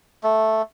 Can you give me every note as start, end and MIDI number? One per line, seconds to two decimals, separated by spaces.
0.23 0.62 57